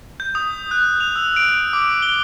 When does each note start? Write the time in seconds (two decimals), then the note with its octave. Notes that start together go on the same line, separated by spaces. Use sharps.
0.20 G6
0.35 D#6
0.71 F#6
1.00 F7
1.16 E6
1.36 D7
1.73 D6
2.02 G7